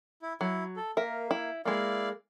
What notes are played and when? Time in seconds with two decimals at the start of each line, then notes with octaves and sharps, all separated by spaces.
0.22 E4
0.41 F#3 E4
0.76 A4
0.97 A#3 A#4 E5
1.31 E4
1.65 G#3 A#3 E4 D5 F5